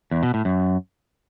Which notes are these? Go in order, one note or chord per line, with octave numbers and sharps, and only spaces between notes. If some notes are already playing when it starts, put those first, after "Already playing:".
E2
B2
A2
F#2